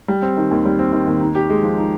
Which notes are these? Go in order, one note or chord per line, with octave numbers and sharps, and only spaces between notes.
G3
C4
D#3
D#2
G3
C4
D#3
D#2
D#4
G4
G#3
F3
D#4